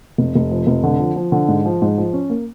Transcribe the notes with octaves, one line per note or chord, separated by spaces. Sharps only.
F1
F1
F3
F1
D3
F3
F3
D3
G#2
F3
G#2
F3
C#4
A#3